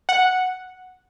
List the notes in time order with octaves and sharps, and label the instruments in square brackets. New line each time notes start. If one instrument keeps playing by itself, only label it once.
[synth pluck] F#5